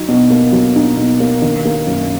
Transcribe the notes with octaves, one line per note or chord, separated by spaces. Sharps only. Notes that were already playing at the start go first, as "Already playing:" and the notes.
Already playing: F#3 D#4
B2
A#3
F#3
D#4
B2
A#3
D#3
A#3
F#2